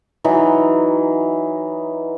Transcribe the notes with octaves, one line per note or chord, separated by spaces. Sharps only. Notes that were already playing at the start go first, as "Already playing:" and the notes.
E3 F#3 D#4 B4